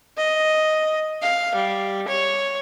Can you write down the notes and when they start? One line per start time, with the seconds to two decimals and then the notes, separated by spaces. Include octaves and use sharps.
0.17 D#5
1.22 F5
1.55 G3
2.08 C#5